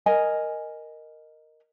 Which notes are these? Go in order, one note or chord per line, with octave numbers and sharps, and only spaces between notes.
A#4 D#5 G#5